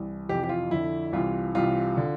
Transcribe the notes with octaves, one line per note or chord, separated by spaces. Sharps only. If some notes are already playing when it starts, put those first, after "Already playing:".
Already playing: C2 E3
F2 C3 E3 G4
G4
F4
F2 D3 E4
C2 C3 E3 F4
C2 C3 E3 F4
D3